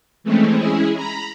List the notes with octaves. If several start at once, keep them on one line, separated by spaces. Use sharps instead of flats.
E3 G#3 A3 C4 C#4
G#3 C#4 E4 G#4
A#5 B5